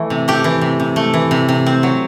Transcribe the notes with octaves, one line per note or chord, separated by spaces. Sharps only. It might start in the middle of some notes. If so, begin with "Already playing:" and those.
Already playing: E3 A3
C3
A3 G4
E3
C3
C3
A3
E3
C3
C3
C4
F#3